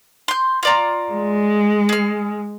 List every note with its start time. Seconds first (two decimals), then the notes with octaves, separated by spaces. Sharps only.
0.28 C6 G6
0.63 F4 D5 A#5
1.13 G#3
1.89 G#4 F6